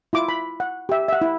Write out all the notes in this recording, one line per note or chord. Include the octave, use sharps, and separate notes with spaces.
E4 F4 D6
B5
F#5
G4 E5
E5 F#5
E4